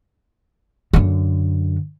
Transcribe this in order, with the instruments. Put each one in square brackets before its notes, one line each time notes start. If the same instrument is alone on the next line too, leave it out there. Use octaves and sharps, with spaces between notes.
[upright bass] F#2 D3